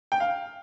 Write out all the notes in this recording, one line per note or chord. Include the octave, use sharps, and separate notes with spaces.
G5
F5